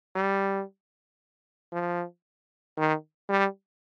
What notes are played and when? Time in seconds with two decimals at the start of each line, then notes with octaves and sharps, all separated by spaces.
0.15 G3
1.73 F3
2.77 D#3
3.29 G3